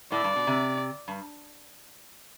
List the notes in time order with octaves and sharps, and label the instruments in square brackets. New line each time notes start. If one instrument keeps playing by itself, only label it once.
[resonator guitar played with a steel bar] A2 [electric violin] D5
[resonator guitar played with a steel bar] G2
B2
C3
G2